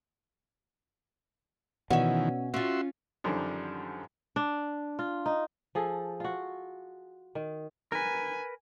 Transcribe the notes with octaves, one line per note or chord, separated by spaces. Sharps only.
B2 D#3 E3 C#4 E5 F#5
C#4 F4 F#4 E5 C6
F#2 D3 D#3 F3 G3 D4
D4
F4
D#4
F3 G#4 A4
F4 F#4
D#3
A#4 B4 G#5